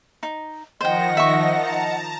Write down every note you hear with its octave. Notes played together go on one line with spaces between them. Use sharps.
D#4
D#3 F3 C5 D#5 F#5 G5 A#6
E5 C#6
A5 A#5